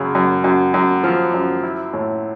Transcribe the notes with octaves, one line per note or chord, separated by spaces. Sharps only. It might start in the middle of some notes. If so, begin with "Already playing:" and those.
Already playing: F#2 C#3
F#2
F#2
F#2
F3
F#2
E4
A2